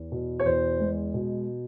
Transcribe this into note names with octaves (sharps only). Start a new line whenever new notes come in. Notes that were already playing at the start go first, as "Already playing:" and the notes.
Already playing: E2
B2
C#5
E2 C5
G#3
B2